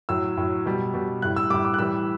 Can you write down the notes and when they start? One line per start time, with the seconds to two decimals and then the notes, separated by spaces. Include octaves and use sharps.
0.09 A2 F#3 E6
0.37 A2 F#3
0.66 B2 G3
0.94 B2 G3
1.22 A2 G3 F#6
1.36 E6
1.50 A2 G3 D6
1.65 D6
1.74 F#6
1.79 A2 E3 G3 E6